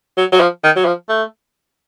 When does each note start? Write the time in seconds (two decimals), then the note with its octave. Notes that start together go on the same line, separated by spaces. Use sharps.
0.17 F#3
0.32 F#3
0.40 F3
0.64 D#3
0.76 F#3
0.86 F3
1.09 A3